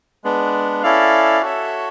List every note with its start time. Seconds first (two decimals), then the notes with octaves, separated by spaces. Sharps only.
0.24 G#3 B3 D4
0.83 C#4 E4 A4 D5 F5
1.42 F#4 A4 C#5 E5